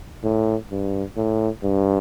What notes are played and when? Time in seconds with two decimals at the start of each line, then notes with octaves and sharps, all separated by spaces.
0.24 A2
0.71 G2
1.17 A2
1.63 G2